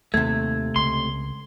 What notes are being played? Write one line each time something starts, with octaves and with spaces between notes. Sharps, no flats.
D#2 C3 A3 G#6
C#2 C6